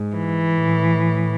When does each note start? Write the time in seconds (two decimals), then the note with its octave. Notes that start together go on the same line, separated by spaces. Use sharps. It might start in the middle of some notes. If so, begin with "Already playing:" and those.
Already playing: G#2
0.16 E3
0.54 A2